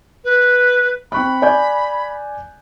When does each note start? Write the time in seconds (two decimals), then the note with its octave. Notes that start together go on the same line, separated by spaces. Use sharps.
0.24 B4
1.12 C4 B5 C#6 F#6
1.42 D5 G#5 G6